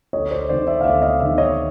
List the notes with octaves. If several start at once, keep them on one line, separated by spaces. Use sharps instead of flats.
D2 C#5 D#5
C5 D5
C3 D#3 C5 D5
D5 E5
F5
D2 D5 E5
D#5 F5
C3 D#3 D5 E5
C#5 D#5